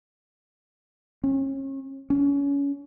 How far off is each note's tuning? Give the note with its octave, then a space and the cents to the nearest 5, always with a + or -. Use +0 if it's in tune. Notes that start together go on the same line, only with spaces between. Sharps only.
C#4 -35
C#4 +25